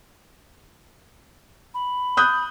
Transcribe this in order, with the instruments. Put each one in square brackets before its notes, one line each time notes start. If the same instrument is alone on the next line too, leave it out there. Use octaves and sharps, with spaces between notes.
[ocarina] B5
[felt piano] D#6 F#6 G6